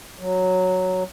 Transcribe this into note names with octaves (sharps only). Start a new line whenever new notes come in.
F#3